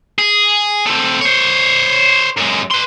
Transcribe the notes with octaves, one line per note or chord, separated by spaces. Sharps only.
G#4
A3 C4
C5 C#5
F#2 G#3
B4 C6